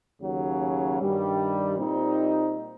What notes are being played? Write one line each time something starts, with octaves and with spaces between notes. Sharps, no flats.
D#2 C#3 F#3
G2 D#3 G3
A#2 G3 C4 D#4